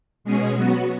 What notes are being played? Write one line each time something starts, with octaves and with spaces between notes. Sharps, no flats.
B2 G#3 C#4 G#4
F#3 B3 F#4